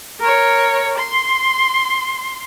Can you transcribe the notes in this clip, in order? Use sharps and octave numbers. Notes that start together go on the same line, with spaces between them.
A#4 C#5
C6